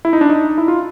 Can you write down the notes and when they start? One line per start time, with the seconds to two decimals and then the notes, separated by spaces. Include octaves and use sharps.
0.05 E4
0.13 D#4
0.21 D4
0.29 D#4
0.58 E4
0.68 F4